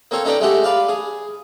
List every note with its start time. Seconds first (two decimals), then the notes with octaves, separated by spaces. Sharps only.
0.11 A#3 C4 A4 C#5
0.25 C#4 D#4 A4 B4 D5 G5
0.40 G#3 A3 C#4 F#4 G4 A4
0.63 B4 D5 F5 A5
0.89 G#4